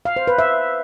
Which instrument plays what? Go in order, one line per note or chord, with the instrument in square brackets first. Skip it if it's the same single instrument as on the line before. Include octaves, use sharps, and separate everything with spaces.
[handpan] F5
C5
B4
E5